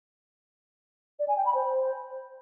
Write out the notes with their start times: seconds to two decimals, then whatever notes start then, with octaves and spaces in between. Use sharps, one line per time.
1.19 D5
1.28 G#5
1.36 G5
1.45 B5
1.54 C5